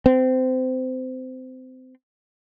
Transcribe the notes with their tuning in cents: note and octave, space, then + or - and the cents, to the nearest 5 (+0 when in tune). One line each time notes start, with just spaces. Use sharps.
C4 -25